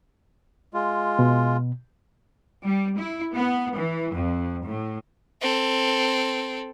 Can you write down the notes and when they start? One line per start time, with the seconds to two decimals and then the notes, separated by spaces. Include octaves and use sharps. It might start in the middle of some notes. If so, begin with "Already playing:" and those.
0.74 G#3 F4
1.19 B2
2.62 G3
2.96 E4
3.35 B3
3.77 E3
4.13 F2
4.67 A2
5.41 C4 A4